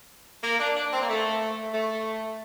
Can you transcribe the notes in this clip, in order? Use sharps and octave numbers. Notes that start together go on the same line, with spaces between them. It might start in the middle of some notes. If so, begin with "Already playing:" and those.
A#3
D4
D4
C4
A#3
A3
A3